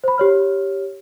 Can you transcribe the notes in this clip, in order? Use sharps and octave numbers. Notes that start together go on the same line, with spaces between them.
C5 B5
G4 C#5 F6